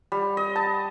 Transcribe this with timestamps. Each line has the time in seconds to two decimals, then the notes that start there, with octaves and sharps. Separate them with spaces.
0.12 G3
0.37 D#5
0.56 A5